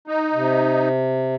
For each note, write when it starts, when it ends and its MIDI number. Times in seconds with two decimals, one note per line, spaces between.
0.08 0.89 63
0.34 1.35 48